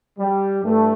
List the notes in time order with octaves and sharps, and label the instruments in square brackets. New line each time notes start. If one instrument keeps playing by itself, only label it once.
[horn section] G3
G2 E3 A3